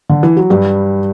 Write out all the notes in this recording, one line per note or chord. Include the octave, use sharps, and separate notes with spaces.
D3
E3
F#3
G2 G3